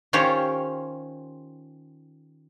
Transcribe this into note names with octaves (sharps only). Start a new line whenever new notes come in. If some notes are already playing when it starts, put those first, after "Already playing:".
D#3 C#4 F4 G4 C5 C#5